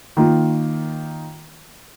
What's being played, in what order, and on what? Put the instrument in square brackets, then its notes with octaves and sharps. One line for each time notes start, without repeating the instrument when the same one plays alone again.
[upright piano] D#3 A#3 F4